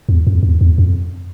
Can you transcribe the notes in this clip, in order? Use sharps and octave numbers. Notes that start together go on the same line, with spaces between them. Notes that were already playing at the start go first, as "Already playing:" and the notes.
E2
F2
E2
E2
F2